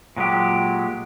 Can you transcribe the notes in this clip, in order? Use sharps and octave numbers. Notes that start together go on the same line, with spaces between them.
A#2 F#3 G#3 G4